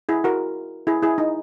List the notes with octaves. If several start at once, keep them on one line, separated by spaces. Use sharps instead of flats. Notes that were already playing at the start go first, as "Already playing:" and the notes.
E4 G#4
F#4 A#4
E4 G#4
E4 G#4
D#4